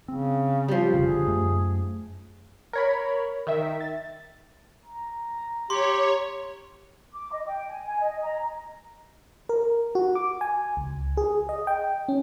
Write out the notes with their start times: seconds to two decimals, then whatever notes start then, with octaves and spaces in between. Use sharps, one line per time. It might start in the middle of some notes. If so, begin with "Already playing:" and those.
0.08 C#3 C4
0.68 F3 G3
0.94 F1 C#3
1.07 D3 G#4
1.27 F#2 A3
2.73 A#4 C#5 B5
3.47 D#3 E5
3.81 A6
4.86 A#5
5.70 G4 C#5 C6
7.14 D6
7.32 D#5
7.47 G5
7.69 G#5
7.85 G#5
8.00 D#5
8.23 A#5
9.49 A#4
9.95 F#4
10.15 D6
10.41 G#5
10.77 C#2
11.17 G#4
11.49 D#5
11.67 G5
12.08 C#4